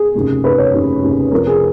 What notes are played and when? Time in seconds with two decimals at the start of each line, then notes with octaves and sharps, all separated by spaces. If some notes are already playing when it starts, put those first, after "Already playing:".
Already playing: G#4
0.15 F1 D#2 C#3
0.44 F1 D#2 C#3 B4
0.58 C#5
0.73 F1 D#2 C#3
1.02 F1 D#2 C#3
1.31 F1 F2 F3 A#4
1.47 G#4